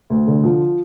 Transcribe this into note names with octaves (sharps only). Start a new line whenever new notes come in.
D2
D3
F3